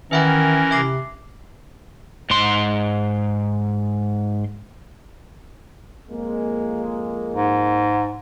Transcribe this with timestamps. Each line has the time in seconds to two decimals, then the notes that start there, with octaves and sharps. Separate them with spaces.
0.11 D#3 E3 C#4 A#4 B4 E5 F#5
0.71 C3 E5 D6 C7
2.30 G#2 C6
6.10 F2 G#3 A#3
7.34 G#2